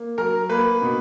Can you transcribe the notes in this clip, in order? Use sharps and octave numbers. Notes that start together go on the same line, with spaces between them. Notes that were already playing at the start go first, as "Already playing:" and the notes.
Already playing: A#3
F#3 A#4 A#5
A#3 B4 B5
B2